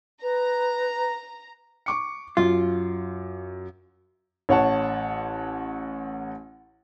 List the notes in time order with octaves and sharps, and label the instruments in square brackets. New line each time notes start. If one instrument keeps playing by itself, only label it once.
[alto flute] B4 [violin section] A#5
[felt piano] C#6 D6 C#7
[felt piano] F#2 [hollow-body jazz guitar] F4
[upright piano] A1 C#5 F#5 A5